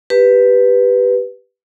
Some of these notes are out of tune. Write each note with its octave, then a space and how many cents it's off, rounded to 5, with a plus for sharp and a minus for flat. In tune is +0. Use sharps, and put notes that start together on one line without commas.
G4 +0 B4 +0